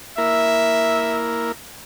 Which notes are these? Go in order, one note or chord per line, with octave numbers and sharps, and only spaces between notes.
A#3 E4 A#4 E5